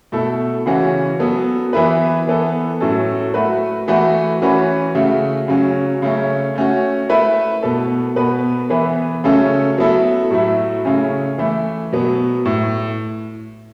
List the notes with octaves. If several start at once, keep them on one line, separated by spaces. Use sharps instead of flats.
B2 A3 E4 A4
C#3 E3 C#4 F#4
F#3 B3 A4
E3 B3 E4 B4
E3 B3 A4
A2 F#3 C#4 A4
A3 F#4 B4
E3 A3 F#4 B4
E3 C#4 F#4 B4
C#3 A3 F#4
C#3 F#3 C#4
C#3 A3 C#4
A3 C#4 F#4
A3 E4 B4
B2 B3 A4
B2 B3 F#4 B4
E3 B3 E4 B4
C#3 F#3 A3 C#4 A4
F#3 B3 E4 A4
A2 F#3 A3 E4
C#3 A3 C#4
E3 A3 E4
B2 F#3 B3
A2